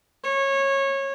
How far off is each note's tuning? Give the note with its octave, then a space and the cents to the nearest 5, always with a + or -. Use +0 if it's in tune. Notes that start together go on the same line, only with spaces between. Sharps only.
C#5 -20